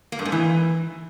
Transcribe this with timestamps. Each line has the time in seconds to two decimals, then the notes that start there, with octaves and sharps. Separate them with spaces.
0.12 A#3
0.19 G2
0.25 G#2
0.32 E3